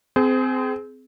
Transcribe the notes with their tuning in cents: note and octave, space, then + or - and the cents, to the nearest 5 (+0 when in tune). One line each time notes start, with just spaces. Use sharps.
C4 -20 G#4 +20 C5 -30